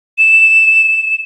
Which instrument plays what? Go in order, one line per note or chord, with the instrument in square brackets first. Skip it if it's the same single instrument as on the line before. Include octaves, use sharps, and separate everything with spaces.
[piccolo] E7